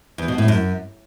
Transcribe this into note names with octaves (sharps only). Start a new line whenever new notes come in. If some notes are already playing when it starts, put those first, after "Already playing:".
E2
B2
A2
F#2